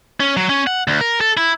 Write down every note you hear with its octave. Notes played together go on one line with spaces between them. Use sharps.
C#4
F#3
C#4
F#5
D2
A#4
A4
E4